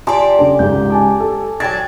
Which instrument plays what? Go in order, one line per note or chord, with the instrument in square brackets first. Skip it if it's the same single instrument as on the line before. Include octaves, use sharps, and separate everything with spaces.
[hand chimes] F4 G#5 [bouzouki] G4 D5 [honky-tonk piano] A5 C6
[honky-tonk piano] C#3 D4 [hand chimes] A4
[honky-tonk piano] C#2 G#2 [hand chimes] G6
[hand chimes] G#5 A5 D6
[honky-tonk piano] A4
[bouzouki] F#3 D4 [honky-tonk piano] G5 G#6 A6